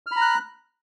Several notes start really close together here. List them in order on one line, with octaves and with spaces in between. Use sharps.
F6 B5 A#5 F#6